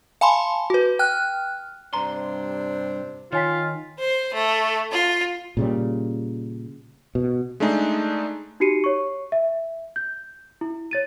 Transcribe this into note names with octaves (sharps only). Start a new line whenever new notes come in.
F5 G#5 A5 B5 C6
F#4 B4
G5 F6 F#6
G2 C3 D4 C5 A#5 C6
D#3 F4 C#5 G#5 B6
C5
A3
F4
A#2 C#3 G3
B2
G#3 A3 D4 D#4 G#4
D#4 F#4 G4 C7 C#7 D#7
C#5 C#6
E5
G6
E4
C#5 A6 D#7